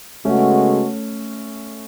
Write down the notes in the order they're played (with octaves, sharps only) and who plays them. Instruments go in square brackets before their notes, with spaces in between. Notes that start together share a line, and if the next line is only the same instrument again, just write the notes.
[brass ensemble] C#3 G#3 B3 F#4 A4 [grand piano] A3 C#4